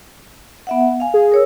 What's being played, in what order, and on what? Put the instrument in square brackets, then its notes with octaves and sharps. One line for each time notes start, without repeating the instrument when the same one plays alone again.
[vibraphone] B3 E5 F#5
F5 G#5
[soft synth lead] G#4
[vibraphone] A#4 C#5 E6